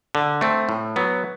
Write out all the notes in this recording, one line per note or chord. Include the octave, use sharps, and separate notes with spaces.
D3
A3 C4
A2
F#3 B3